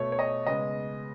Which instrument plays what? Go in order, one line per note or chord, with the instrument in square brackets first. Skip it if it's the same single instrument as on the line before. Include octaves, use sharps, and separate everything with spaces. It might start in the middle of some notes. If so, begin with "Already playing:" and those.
Already playing: [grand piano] B2 A3 C#5
C#5
D#5
C#3 G#3 B3 D#5